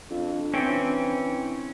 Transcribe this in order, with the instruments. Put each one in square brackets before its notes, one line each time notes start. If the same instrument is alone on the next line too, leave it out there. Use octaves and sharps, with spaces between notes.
[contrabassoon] F2 [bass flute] D4
[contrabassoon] E3 [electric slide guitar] C4 G5 [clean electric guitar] C#4